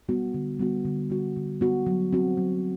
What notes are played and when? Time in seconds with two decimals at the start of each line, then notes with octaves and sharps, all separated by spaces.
0.09 G3 B3 F#4
0.34 D3
0.59 G3 B3 F#4
0.85 D3
1.10 G3 B3 F#4
1.36 D3
1.61 G3 B3 F#4
1.87 F#3
2.13 C4 F#4
2.37 F#3